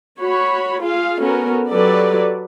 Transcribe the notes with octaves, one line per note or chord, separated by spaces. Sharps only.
F#4 C#5 B5
F4 G#4 F5
B3 C#4 F#4 A4 A#4
F#3 G4 A4 B4 D5